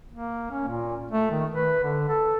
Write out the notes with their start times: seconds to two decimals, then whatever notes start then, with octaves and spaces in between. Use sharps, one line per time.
0.12 A#3
0.51 C#4
0.68 A#2
1.11 A3
1.31 D#3
1.54 B4
1.83 D3
2.09 A4